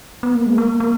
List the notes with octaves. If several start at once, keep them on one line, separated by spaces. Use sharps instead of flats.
B3
A#3
G#3
A#3
A#3